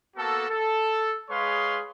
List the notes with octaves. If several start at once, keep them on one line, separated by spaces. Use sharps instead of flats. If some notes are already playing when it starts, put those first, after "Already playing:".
A#3 B3 F#4 A4
A4
G#3 G#4 B4 C#5 F5 C6